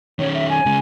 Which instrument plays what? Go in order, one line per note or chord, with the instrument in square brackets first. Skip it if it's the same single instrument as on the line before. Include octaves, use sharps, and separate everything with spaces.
[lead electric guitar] D#3 C#4 [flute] C#5
[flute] E5
G#5
[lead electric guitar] C#3 G#3